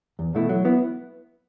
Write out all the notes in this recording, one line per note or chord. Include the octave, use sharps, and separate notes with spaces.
E2
B2 A3 E4
F#3
B3 E4